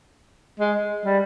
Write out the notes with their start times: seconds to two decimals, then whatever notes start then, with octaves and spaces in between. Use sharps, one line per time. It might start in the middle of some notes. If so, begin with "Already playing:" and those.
0.59 G#3
1.05 G3